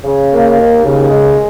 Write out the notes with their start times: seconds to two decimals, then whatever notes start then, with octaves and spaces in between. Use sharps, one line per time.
0.04 C#3
0.31 A#3
0.58 D#2
0.84 C#3
1.10 G#3